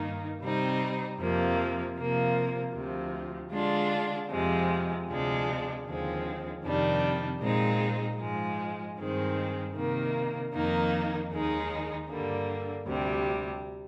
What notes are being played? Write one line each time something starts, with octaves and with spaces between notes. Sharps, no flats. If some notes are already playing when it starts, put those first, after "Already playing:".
Already playing: G2 D#3 A#3 D#4
C3 G3 C4 D#4
F2 C3 F3 A#3
C3 F3 A#3
D2 C3 F3
D3 G#3 D4 F4
F2 C3 F3 G#3
D2 C3 F3 G#3 D4
D#2 D3 F3 G#3 C4
F2 C3 D#3 G3 D4
A#2 G#3 C4 D#4
G#2 F3 G#3
G2 D#3 G#3 C4
C3 D#3 A#3
F2 D#3 A#3 D#4
D#2 D#3 G#3 D#4
G2 D3 G3 A#3
D2 C3 G3